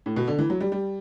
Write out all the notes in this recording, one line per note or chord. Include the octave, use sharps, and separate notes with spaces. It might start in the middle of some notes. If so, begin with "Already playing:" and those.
A2
B2
D3
E3
F#3
G3
G3